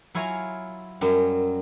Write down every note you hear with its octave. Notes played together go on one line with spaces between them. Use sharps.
F#3 E4 F4 C#5 G#5 A#5
F#2 F#3 G3